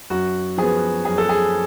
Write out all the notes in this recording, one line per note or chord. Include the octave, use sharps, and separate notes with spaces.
F#2 F#4
F3 B3 G#4
F#2 G#4
A4
G#4